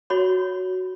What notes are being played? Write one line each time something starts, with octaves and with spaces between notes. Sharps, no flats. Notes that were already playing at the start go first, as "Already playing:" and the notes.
F#4 C#5 B5 C6